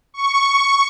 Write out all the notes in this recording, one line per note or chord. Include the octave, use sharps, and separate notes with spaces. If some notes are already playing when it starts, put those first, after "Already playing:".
C#6